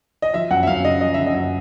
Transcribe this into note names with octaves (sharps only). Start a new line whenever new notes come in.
D#5
F3 E5
F#2 F#5
E5
F#2 F5
C#3 D#5
F3 D#5
C#3 E5
D#5
F#2